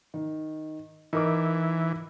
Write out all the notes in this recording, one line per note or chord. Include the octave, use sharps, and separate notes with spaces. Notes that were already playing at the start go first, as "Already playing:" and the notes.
D#3
E3 D#4 A#4 D6